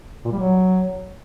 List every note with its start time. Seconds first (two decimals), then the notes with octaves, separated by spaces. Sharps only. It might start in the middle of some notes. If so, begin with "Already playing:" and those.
0.25 A#2
0.32 G3
0.39 F#3